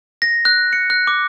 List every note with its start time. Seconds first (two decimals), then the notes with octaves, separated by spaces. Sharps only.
0.22 A#6
0.45 F#6
0.73 C#7
0.90 F#6
1.07 D6